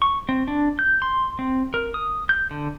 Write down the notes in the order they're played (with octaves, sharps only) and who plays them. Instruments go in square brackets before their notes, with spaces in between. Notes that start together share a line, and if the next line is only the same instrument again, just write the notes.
[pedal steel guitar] C#6
C4
D4
G6
C6
C4
A#4
D#6
G6
D3